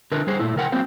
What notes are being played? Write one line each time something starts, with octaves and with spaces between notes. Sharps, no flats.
D3 A#4 B4
G3 G#4 C5
A#2 A3 E4
C#3 A#4 F#5 G5
F#3 A#3 C4 C5 F5